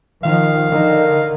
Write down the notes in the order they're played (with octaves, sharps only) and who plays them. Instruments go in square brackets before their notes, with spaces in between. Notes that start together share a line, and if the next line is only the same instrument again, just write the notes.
[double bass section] D#3 F3 [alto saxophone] F5
[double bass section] D3 D#3